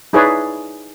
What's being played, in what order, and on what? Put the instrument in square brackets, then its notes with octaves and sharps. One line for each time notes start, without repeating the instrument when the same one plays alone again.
[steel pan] D#4 E4 G#4 B4 C#5 D5